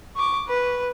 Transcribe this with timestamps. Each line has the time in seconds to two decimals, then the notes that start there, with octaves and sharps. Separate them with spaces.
0.16 C#6 D6
0.48 B4